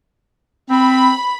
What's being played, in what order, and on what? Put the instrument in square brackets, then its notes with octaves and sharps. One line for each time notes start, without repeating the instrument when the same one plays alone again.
[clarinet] C4 [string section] B5